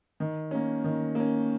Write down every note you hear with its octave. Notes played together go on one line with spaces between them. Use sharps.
D#3
A#3 C#4
D#3
A#3 C#4